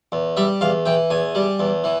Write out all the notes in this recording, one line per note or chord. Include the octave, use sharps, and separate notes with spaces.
E2
G3 E5
E2 F5
E3 G5
E2 G#5
G3
E2
E3